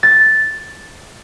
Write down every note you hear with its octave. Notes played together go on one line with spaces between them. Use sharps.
A6